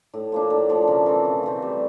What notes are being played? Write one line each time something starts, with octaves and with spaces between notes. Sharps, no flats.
A2
F3 A#3 D4
A2
F3 A#3 D4
C#3
E3 A3 C4
C#3
E3 A3 C4
G3